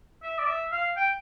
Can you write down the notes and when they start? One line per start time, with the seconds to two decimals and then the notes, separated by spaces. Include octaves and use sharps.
0.23 E5
0.38 D5
0.47 E5
0.72 F5
0.96 G5